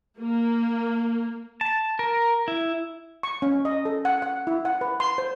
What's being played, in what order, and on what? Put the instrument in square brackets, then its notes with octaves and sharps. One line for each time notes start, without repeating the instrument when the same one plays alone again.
[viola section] A#3
[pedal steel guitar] A5
A#4
E4
[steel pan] C#6
C#4
D#5
A4
F#5
F#5
E4
F#5
B4
C6
C5